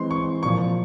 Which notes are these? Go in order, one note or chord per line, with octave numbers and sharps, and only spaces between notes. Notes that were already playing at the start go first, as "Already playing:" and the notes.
Already playing: E3 G#3 C4 C6
C#6
A#2 F3 A#3 C#6